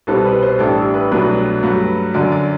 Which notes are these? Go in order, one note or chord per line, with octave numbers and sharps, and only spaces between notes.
C2 B2 G3 C4 A4
B4
C5
A1 A2 G3 D4 A4
B4
C2 B2 F#3 A3 D4 B4
G2 F#3 A3
F#2 D3 F#3 D5
D5